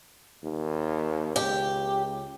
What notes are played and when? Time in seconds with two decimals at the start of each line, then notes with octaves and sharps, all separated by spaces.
0.43 D#2
1.36 C#2 G4